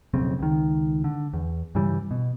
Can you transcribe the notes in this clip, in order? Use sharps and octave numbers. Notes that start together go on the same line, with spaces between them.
F1 B1 C#3 C4
C#2 D#3
D3
E2
G2 C#3 E3 G3
B2